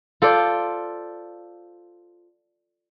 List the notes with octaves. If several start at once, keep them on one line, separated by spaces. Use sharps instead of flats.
F4 A4 C5 D5